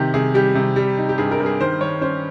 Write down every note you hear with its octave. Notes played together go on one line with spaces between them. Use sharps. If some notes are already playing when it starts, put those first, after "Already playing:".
Already playing: C3 D#3 G4
C3 G#4
G3 G4
C3
G3
D#4
G4
G2 G#4
A#4
G2
G#4
D#3 C5
D#3 C#5
C#4 C5